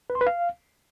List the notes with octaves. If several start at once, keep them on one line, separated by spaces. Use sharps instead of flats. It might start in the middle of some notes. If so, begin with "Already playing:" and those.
B4
C6
B4
F5